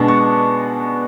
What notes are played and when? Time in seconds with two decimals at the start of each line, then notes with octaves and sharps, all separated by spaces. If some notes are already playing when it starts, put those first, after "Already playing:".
Already playing: B2 G#3 B3 D4 A5
0.08 C#6